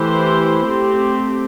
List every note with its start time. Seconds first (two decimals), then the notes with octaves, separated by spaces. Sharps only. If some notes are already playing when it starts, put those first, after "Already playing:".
Already playing: E3 A3 E4 G4 C5
0.64 A3 C4 G4